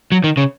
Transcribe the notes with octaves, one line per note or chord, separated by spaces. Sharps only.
F#3
D#3
C#3